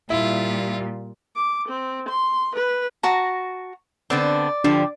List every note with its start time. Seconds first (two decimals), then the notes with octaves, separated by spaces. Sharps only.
0.10 A#2 G3 E4 F4
1.36 D6
1.68 C4
2.09 C6
2.55 B4
3.03 F#4 A5 A#5
4.10 D3 B3 C4 D5
4.64 D3 F3 D4 G4